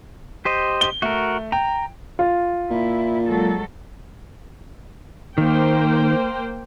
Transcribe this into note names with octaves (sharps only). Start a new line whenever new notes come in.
G4 C5 D#5
G7
A3 F#4 A#4
G5 A#5
F4
A#2 E4
F#3 G#3 A4
D#3 A#3 C5 G5